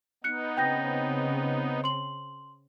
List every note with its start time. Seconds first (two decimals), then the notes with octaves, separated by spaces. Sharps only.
0.24 B3 D#4 F#6 C#7
0.57 C#3 C4 G5 G6 A#6
1.84 C6 F#7